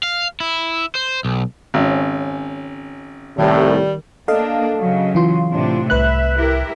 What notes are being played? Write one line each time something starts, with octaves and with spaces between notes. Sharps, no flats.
F5
E4
C5
B1
G#1 C4 C#4
C2 A2 D#3 G3
A#3 D4 A4 D#5 F5
C#3 F#3
E3 F4 C6
A2 C3 D4
C2 B4 E5 F#6
E4 G4 A#4